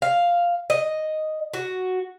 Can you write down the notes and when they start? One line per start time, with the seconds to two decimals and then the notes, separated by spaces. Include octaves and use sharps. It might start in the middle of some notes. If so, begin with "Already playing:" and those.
0.02 F5
0.70 D#5
1.53 F#4